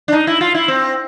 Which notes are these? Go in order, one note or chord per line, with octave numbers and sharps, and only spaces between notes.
D4
D#4
E4
F4
E4
C4